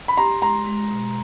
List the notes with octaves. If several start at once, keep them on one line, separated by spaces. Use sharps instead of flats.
B5
G4 A#5 C6
G#3 A#5 C6
G#3
B2